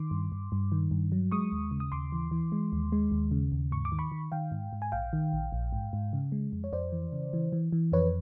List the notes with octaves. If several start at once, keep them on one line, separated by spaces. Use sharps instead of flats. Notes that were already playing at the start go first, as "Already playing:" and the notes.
Already playing: D#3 C6 D6
G2
G2
G2
D#3
G2
F#3
G#3 C#6 D#6
D#2
C#3
D#6
D#2 C6 D6
E3
E3
G#3
D#2
G#3
D#2
C#3
D#2
G#2 C#6
D6
D#3
B5 C#6
D#3
D#3 F5 G5
G#2
G#2
G#5
A#1 F5 G5
D#3
A#1
A#1
G#2
G#2
C#3
G#3
F2
C#5
F2 C5 D5
E3
C#3
E3
E3
E3
F2 B4 C#5